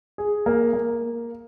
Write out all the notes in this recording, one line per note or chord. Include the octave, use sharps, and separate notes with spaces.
G#4
A#3
A#3